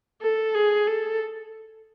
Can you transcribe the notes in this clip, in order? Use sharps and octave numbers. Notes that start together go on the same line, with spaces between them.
A4
G#4
A4